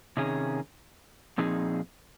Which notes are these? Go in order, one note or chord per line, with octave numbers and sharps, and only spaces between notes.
C3 D#3 C#4 G#4
A#2 F3 C4 D#4 G#4